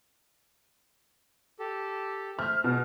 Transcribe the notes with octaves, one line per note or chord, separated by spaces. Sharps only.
G4 A4
A3 C5 E5 F6
B2 G#4